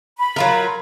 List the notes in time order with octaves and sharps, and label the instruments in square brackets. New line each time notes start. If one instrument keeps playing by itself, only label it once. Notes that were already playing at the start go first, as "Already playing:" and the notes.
[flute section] B5
[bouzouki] F#3 F4 A#4